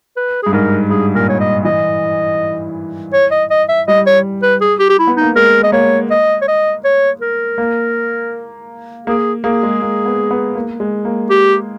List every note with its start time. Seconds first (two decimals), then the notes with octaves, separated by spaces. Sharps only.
0.16 B4
0.43 G2 G#4
0.53 G#2 A#4
0.90 G2 G#4
1.15 A#2 A#4
1.29 C#5
1.40 D#5
1.65 E3 D#5
3.13 C#5
3.31 D#5
3.50 D#5
3.68 E5
3.88 G3 D#5
4.06 C#5
4.42 B4
4.61 G#4
4.79 G4
4.89 G4
4.99 E4
5.07 B3
5.17 A#3 D#4
5.36 G#3 A#4
5.63 D#5
5.72 A#3 C#5
6.11 D#5
6.42 C#5
6.48 D#5
6.84 C#5
7.21 A#4
7.58 A#3
9.07 A#3 G#4
9.44 A#3 G#4
9.63 G#3
9.82 A#3
10.06 B3
10.31 B3
10.55 A#3
10.80 G#3
11.05 A#3
11.30 G4